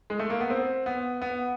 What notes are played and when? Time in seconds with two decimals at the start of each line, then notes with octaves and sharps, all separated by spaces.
0.10 G#3
0.19 A3
0.30 A#3
0.40 B3
0.50 C4
0.86 B3
1.22 B3